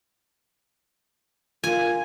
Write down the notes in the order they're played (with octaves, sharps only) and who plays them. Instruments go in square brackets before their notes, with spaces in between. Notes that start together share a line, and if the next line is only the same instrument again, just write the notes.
[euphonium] F4 [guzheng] G#5